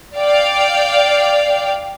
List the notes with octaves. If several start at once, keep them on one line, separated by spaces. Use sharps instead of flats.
D5 F5 G5